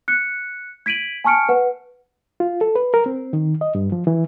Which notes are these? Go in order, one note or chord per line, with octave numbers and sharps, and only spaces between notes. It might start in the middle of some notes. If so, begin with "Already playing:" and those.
F#6 C#7
G#6 B6 D7 D#7 F#7
G#5 A5 C#6 F6 C#7 D7
B4 F#5
F4
A4
B4
A#4
C4
D#3
D#5
G2
F3
E3